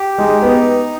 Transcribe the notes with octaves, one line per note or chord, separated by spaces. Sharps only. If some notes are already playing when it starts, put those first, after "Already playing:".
Already playing: G4
G#3 D#4
B3